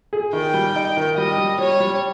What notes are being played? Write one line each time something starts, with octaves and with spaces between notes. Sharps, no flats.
G#4
D#3 G5
G3
D#4
D#3
G3 D#5
G3
G3 C#5
G3